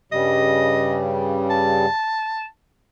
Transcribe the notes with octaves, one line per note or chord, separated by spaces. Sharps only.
G2 C#3 G3 D#5
A5